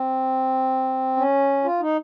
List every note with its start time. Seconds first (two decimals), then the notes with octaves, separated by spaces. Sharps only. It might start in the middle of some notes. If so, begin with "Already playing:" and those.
Already playing: C4
1.16 C#4
1.64 F4
1.80 D#4